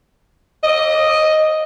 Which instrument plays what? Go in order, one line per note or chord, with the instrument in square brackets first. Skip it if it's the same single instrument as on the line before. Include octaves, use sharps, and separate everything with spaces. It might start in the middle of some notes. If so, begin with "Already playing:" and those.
[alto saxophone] D#5